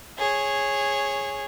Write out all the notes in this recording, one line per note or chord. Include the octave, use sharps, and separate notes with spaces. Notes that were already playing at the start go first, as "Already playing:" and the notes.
G#4 C#5